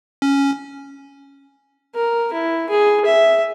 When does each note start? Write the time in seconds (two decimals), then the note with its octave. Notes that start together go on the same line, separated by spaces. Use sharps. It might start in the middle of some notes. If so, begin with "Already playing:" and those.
0.22 C#4
1.95 A#4
2.33 E4
2.70 G#4
3.06 E5